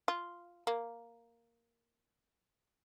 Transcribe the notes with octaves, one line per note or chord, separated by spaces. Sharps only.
F4
A#3